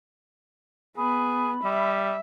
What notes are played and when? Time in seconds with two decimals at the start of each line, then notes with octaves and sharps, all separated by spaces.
0.97 B3 G#4 B5
1.64 G3 E5